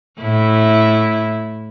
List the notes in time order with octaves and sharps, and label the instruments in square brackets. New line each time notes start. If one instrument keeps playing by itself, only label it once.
[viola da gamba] A2 E4